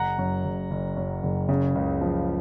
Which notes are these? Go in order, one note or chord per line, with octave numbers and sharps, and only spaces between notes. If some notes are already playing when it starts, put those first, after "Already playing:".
Already playing: F#1 F#5 A#5
F#2
F#1
F#1
F#2
F#1
C#3
C#2
F3